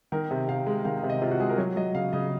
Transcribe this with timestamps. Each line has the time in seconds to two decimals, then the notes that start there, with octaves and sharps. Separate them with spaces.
0.12 D#3 A#4
0.31 C3
0.48 C3 F5
0.66 G#3
0.85 D#3 F5
0.97 F5
1.03 C3
1.10 D#5
1.22 C3 F4
1.31 F#4
1.40 G#3 G#4
1.49 A#4
1.58 F#3 C#5
1.76 F#3 D#5
1.95 C#3 F5
2.13 C#3 D#5